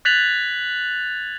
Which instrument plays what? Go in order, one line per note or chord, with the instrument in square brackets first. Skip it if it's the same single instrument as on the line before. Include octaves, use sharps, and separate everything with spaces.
[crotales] F#6 G#6 A6 B6 F7 F#7